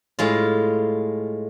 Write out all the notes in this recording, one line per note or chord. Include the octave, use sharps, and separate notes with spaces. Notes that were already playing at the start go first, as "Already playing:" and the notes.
A2 G#3 F4